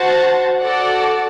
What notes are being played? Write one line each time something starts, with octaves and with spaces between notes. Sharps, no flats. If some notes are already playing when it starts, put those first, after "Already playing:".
Already playing: F#4 C5 F#5 A5
F#4 A4 D5 F#5